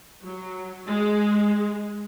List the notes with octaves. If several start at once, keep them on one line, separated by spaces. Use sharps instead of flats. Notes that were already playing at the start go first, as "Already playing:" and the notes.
F#3
G#3